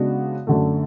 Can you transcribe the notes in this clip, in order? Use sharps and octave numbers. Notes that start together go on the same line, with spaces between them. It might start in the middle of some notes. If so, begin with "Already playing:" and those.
Already playing: C#3 G#3 B3 D4 F#4
F#2 D3 A3